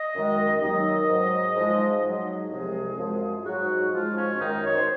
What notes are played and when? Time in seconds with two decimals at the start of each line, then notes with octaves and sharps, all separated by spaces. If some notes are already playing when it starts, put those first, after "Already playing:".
Already playing: D#5
0.15 F#2 D#3 G#3
0.62 D#2 D#3 F#3 D#5
1.08 G#2 F#3
1.56 G#2 F3 G#3
2.04 G#2 F#3
2.50 C2 C3 F3 G#3 G#4
2.98 F#2 F3 G#3
3.44 G#2 F#3 F#4
3.92 G#2 F3 G#3 F4
4.16 C#4
4.39 F#2 D#3 G#3 D#4
4.63 C#5
4.75 C5